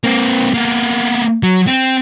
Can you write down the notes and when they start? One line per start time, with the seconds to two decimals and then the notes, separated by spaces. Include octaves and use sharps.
0.04 A#3 C4
0.54 A#3 B3
1.43 F#3
1.67 C4